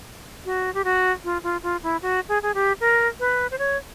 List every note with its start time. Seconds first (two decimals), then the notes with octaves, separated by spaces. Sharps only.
0.45 F#4
0.74 G4
0.84 F#4
1.24 F4
1.44 F4
1.63 F4
1.83 E4
2.02 F#4
2.29 G#4
2.42 G#4
2.54 G4
2.80 A#4
3.20 B4
3.51 C5
3.59 C#5